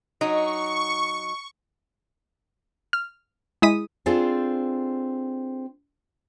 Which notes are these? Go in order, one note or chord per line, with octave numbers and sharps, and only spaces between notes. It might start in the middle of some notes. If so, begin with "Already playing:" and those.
F#3 D#4 C#6
F6
G#3 E4 D#6 B6 D#7
C4 D4 F4 G#4 A4 C5